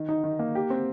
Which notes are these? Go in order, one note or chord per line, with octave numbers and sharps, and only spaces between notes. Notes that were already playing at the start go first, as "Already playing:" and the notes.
Already playing: D#3
D#4
D#3
A#3
G4
C4